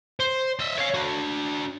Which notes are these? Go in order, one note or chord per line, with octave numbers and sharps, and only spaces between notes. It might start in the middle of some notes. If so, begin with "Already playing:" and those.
C5
D#5 E5
C#5 F5
D4 F#4